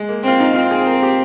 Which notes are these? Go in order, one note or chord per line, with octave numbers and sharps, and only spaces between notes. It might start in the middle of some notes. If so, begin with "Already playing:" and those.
Already playing: G#3
A#3
C4 F4
D#4
C4 F4
G#4
A#4
G4